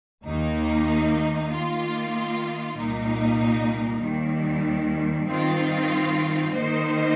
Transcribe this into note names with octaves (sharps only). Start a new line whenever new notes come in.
D#2 D#3 A#3 D#4
D#3 A#3 F4
C2 A#2 A#3 D#4
D#2 D#3 G3
G2 D#3 C4 F4
D#3 A#3 D#4 C5